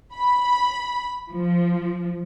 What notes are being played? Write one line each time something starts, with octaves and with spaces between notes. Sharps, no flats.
B5
F3